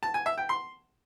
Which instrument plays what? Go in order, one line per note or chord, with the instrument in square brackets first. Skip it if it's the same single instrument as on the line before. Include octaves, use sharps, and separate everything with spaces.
[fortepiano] A5
G#5
E5
G5
C6